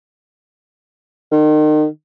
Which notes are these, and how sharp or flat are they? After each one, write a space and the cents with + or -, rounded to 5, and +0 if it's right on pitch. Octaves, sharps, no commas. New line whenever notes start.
D#3 -35